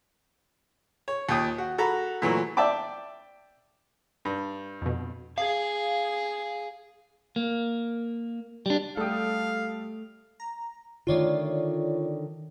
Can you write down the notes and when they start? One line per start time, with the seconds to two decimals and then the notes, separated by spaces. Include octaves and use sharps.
1.08 C#5
1.29 D#2 A#2 G5 D#6
1.58 F#4
1.78 F#4 A4 A#5 B5
2.22 A#2 E3 F#3 A3
2.57 D5 E5 G5 A5 D6
4.25 G2
4.82 F2 B2
5.38 G#4 F5
7.36 A#3
8.66 G3 D4
8.97 G3 A3 G4 A4 F5 G5 D#6
10.40 A#5
11.07 D3 D#3 A3 F4 C#5 D5